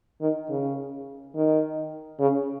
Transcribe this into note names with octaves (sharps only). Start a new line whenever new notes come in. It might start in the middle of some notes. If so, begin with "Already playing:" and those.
D#3
C#3
D#3
C#3